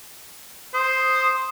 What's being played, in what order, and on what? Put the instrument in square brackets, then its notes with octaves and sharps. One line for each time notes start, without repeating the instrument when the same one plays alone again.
[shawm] C5 [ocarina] D#6